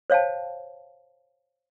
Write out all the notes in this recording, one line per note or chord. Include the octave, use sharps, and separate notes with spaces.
C5 C#5 F5 G5 A5